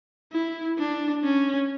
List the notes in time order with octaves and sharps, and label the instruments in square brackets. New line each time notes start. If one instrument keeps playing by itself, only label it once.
[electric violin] E4
D4
C#4